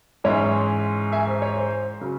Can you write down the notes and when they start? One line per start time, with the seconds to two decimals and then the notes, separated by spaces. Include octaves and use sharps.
0.24 G#2 E3 G#3 C#4 C#5 E5
1.12 E5 G#5
1.27 C5
1.42 C#5
1.57 C5
2.01 C#3 F#3